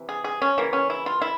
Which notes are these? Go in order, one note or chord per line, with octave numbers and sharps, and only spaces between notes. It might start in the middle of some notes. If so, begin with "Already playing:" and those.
Already playing: C3 E3
G#4
G#4
C#4
C#3 E3 A#3
C#4
E4
F4
E4